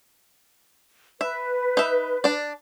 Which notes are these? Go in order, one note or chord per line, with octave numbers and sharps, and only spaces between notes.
B4 E5
D#4 E5
D4 D5